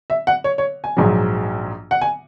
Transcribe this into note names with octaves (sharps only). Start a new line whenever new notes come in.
E5
F#5
C#5
C#5
G#5
A#1 G#2 F#3
F#5
G#5